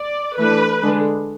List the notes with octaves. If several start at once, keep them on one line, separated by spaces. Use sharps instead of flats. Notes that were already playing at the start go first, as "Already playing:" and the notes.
Already playing: D5
E3 A3 D4 B4
D3 G#3 D4